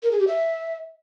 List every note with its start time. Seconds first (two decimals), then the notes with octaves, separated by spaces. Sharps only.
0.03 A#4
0.11 G#4
0.19 G4
0.27 E5